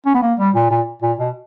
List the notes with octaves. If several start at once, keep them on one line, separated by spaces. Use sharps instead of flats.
C#4
B3
A#3
G3
A#2
A#2
A#2
B2